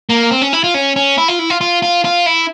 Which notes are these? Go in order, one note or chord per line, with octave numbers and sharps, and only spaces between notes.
A#3
C4
C#4
E4
F4
C#4
C#4
E4
F4
E4
F4
F4
F4
F4
E4